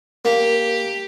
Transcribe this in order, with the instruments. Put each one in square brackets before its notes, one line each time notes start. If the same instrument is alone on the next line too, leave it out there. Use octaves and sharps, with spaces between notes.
[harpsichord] A#3 [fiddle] G4